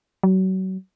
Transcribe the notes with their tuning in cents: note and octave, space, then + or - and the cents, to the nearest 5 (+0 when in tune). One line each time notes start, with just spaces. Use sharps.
F#3 +30